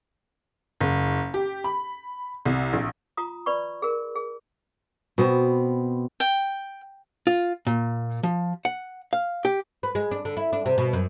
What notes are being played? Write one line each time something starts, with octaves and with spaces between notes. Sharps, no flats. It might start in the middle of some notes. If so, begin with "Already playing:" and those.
F#1
G4
B5
C2
A#1
F4 A#5 D#6
B4 D5 B5 C#6
G#4 A#4
G#4
B2 B3 C4
G5
F4
A#2
F3
F#5
F5
G4
B4
G#3
D4
D3
E4
D4
C3
B2
F#2